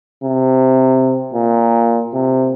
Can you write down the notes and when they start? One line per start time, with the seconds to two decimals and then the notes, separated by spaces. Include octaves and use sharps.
0.24 C3
1.33 A#2
2.14 C3